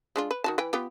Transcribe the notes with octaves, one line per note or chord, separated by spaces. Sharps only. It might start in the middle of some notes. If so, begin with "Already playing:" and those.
G#3 D4 F4
B4
D#3 F#4 A5
E3 B4 G5
B3 F4 G4